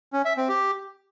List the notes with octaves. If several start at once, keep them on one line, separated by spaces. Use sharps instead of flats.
C#4
E5
C4
G4